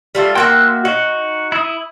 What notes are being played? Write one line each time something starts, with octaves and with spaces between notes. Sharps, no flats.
G3 A3 F4
A#3 F#4 E5 G5 C6 F#6
D#4 F#4
E4 D#6